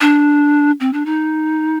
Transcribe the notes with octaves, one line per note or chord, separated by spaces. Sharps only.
D4
C4
D4
D#4